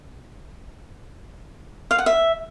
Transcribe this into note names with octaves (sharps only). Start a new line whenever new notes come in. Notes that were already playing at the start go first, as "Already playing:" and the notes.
F5
F#5
E5